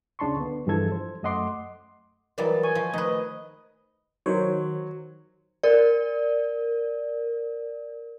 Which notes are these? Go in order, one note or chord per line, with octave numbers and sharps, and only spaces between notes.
C#2 C#3 D4 A5 C6 C#6
D3 B3
G2 E3 F3 G#3 A4 G#6
C5
F#2 A3 D#5 F#5 C6 D6
E3 F#3 G3 A#4 D#5 A6
G#5 C#6
F3
D#3 A3 B4 C5 D#5
D#3 F#3 C5 C#5
A#4 D5